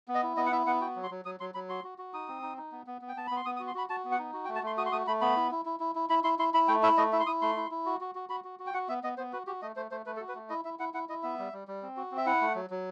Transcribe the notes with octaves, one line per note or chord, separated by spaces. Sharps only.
B3
D#5
E4
B3 D#5
F#5
E4 E5
B3 F#5
F#4 G5
F#3
C6
F#3
F#3 D#6
F#3 C6
F#3 B5
F#4 C6
F#4
F#4
D#4 D#6
C4
D#4
D#4
B3
B3
B3
G5
B3 A5
B3 B5
C6
B3 D#6
D#6
F#4
C6
F#4 B5
F#4 A5
B3
F#5
D#4
F#4
G5
A3
A5
A3 C6
F#4 D#6
C6
A3 D#6
A3 B5
B3 B5
E4
E4
E4
E4
E4
E4 B5
E4 C6
E4 C6
E4 B5
A3 G5
E4 E5
A3 D#5
E4 E5
C6
E4 D#6
A3 C6
E4
E4
F#4
F#4
F#4
F#4 B5
F#4
F#4
G5
F#4 F#5
B3 E5
B3 D#5
B3 C5
F#4 B4
F#4 G4
A3 D#5
A3 C5
A3 C5
A3 B4
A4
F#4
B4
A3
E4 D#5
E4 E5
E4 F#5
E4 F#5
E4 D#5
B3 E5
G3
G3
G3
C4
F#4
C4
E5
E4 F#5
A3
F#3
F#3